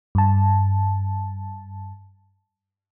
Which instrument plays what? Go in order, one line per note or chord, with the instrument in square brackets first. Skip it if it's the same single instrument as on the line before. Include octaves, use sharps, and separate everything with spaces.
[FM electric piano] G2 A5